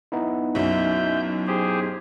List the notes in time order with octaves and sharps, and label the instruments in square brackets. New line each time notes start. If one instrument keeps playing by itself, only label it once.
[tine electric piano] B3 D#4 E4
[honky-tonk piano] B1 F#2 [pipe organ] E5 G6
[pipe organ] G4 G#4 C5